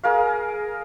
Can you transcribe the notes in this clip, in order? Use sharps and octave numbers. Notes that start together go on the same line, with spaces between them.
G#4 A#4 F5